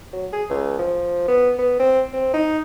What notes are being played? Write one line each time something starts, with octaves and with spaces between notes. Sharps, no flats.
F#3
G#4
C#2
F3
B3
B3
C4
C4
D#4